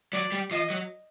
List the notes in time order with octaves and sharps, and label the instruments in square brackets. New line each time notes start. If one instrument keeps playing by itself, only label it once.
[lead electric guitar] F#3 [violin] D5
[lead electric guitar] G3
[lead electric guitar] F3 [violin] D#5
[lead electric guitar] F#3